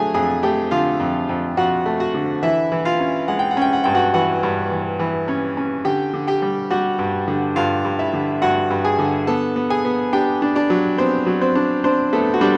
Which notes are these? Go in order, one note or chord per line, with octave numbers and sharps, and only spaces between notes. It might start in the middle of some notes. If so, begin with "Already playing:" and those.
Already playing: D3 F#3 A3 G#4 G#5
F2 G#4 G#5
A3 G4 G5
D3 F4 F5
F2
F2
F2 F#4 F#5
A3
F#4 F#5
D3
E3 E4 E5
E3
F4 F5
C#4
G#3 F#5
G5
F#5
C#4 G5
F#5
G2 G5
F#4 F#5
E3 F#4 F#5
G2
E3
E3
C#4
C#4
D3 G4 G5
D3
G4 G5
G3
G3 F#4 F#5
G2
D3
G2 F4 F5
G2
E4 E5
D3
G2 F#4 F#5
G2
G#4 G#5
D3
B3 A4 A5
B3
G#4 G#5
B3
D4 G4 G5
D4
D4 D5
F#3
B3 C4 C5
F#3
C4 C5
D4
C4 D4 C5
A3 B3 A4
F#4
G3 D4 G4